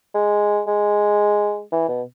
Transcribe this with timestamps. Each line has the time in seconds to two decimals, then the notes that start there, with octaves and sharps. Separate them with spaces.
0.15 G#3
0.67 G#3
1.72 E3
1.89 B2